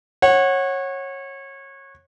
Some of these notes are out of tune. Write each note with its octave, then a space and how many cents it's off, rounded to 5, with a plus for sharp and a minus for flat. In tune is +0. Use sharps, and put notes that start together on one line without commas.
C#5 -20 F#5 +0